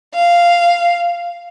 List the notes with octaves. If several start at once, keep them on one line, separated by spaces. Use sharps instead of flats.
F5